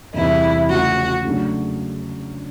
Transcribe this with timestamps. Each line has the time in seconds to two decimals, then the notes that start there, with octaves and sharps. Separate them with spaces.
0.14 E2 C3 E3 G3 E4
0.69 C#3 F3 A3 F#4
1.24 C#3 F#3 A3 D4 F#4